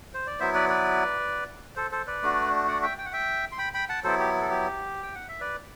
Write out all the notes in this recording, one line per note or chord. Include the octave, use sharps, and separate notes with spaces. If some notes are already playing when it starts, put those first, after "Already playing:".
C5
D5
F#3 B3 E4 C5 E5
B4 D5
B4 D5
A4 C5
A4 C5
B4 D5
A3 D4 F#4
D5 F#5
E5 G5
G5
F#5
E5 G5
C6
G5 B5
G5 B5
F#5 A5
F#3 B3 E4 A4 C5
G4
A4
G4
G5
F#5
E5
B4 D5